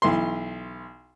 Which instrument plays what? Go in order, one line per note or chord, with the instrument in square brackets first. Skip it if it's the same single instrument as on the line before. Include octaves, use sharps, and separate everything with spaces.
[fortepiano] B1 E3 C6